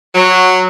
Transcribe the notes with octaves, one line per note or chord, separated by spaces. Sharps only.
F#3